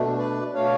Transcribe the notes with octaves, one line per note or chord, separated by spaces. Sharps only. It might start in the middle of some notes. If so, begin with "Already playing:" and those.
Already playing: B2 A3 D4
B4 D5
B2 A3 D4 C#5 F5